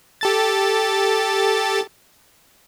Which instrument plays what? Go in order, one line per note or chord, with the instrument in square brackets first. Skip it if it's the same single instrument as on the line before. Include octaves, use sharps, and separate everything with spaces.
[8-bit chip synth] G4 A4 A6